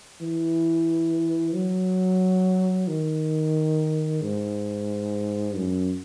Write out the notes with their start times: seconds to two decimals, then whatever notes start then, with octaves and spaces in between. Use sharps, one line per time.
0.22 E3
1.54 F#3
2.88 D#3
4.22 G#2
5.56 F#2